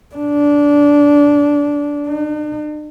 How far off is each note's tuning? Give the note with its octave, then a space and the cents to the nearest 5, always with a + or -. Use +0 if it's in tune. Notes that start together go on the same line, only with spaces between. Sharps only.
D4 -15
D4 +45